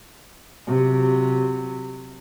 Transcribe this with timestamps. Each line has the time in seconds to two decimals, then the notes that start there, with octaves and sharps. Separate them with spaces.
0.68 C3 F#3